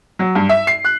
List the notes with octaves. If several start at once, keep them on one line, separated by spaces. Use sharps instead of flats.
F#3
G2
E5
C7
F#6